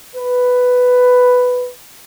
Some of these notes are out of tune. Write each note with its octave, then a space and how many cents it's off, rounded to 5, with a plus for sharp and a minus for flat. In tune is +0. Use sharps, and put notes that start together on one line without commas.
B4 +5